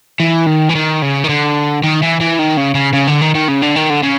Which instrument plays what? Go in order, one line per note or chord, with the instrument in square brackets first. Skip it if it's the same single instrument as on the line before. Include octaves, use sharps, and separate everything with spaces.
[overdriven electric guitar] E3
D#3
E3
D#3
C#3
D#3
D3
D#3
E3
E3
D#3
C#3
C#3
C#3
D3
D#3
D#3
C#3
D3
D#3
D3
C#3